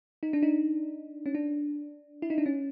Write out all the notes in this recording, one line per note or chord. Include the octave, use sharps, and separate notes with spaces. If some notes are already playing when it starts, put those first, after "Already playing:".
D#4
D4
D#4
C#4
D4
E4
D#4
D4
C#4